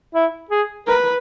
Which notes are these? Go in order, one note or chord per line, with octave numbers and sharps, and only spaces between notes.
E4
G#4
A#4 B4